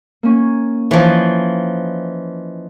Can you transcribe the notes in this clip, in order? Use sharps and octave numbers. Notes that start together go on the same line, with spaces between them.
A#3 C#4
E3 F3 D#4 C#5